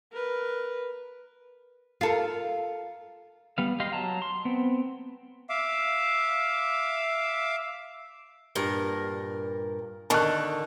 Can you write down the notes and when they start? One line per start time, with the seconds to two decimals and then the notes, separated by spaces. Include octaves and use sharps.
0.12 A#4 B4
2.01 F4 A4 A#4
3.58 G3 B3 F5
3.80 G4 D#5 F5 C6
3.93 F#3 A5 A#5
4.22 C6
4.45 B3 C4
5.49 E5 F5 D6
8.55 G2 A#2 A#4
10.10 D3 D#3 A5 C#6 F#6